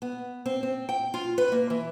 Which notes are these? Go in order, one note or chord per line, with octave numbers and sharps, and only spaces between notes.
B3
C4
C4
G5
F4
B4
A#3
E3